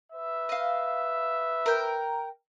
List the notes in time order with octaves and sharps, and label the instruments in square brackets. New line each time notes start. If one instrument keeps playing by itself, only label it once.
[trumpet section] B4 E5
[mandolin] D#5 F5
A#4 G5